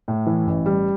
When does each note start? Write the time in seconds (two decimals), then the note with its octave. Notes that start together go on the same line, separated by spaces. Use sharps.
0.08 A2
0.26 E3
0.47 A1
0.66 G3